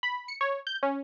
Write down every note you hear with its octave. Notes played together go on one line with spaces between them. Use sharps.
B5
C#7
C#5
G6
C#4